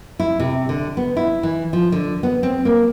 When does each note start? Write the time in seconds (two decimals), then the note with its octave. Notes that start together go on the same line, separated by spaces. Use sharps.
0.19 E4
0.39 C3
0.69 D3
0.97 B3
1.17 E4
1.43 E3
1.73 F3
1.92 D3
2.23 B3
2.43 C4
2.65 A#3